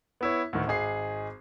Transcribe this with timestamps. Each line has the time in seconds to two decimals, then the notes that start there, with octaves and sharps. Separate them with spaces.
0.21 B3 E4 C#5
0.53 D2 A2 D#3
0.67 G#1 D#4 G#4 C7